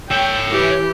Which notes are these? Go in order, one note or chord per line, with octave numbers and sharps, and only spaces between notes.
C#5 E5 G5
E3 G4